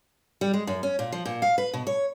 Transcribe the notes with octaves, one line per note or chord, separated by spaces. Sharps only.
G3
G#3
F#2
C#4
A#2
F3
A#2
F5
B4
B2
C#5